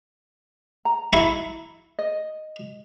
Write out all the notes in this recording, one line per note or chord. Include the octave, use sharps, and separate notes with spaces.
A#5
E4 C#6
D#5